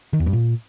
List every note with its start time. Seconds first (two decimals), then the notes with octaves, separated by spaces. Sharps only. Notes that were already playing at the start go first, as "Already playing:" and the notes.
0.13 D#3
0.20 E2
0.26 G2
0.33 A#2